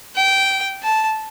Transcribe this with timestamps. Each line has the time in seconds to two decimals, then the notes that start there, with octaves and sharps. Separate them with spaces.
0.16 G5
0.82 A5